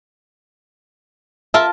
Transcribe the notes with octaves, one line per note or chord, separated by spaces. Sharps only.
F4 A#4 E5 A5